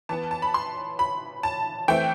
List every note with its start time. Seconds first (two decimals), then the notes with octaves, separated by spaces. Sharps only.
0.09 E3 B3 A5
0.31 A5
0.42 B5
0.54 C6
0.99 B5
1.43 A5
1.88 E3 A3 C4 G5